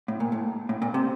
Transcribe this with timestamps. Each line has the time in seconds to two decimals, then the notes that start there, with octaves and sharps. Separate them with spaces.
0.08 A2
0.20 A#2
0.32 A2
0.69 A2
0.82 A#2
0.94 C3